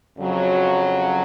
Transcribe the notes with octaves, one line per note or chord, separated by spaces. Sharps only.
F2 C#3 F#3